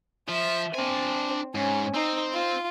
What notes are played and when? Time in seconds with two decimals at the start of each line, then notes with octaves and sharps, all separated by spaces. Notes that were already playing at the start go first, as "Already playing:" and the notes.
0.29 F3 E5
0.74 C4 D4 G#5
1.55 G#2 C#4
1.95 C4 D#4
2.33 F4